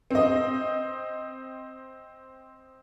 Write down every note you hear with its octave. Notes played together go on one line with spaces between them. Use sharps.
C4 D#5